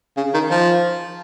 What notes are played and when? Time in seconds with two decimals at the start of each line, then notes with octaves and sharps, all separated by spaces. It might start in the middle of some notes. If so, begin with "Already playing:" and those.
0.17 C#3
0.34 D#3
0.50 F3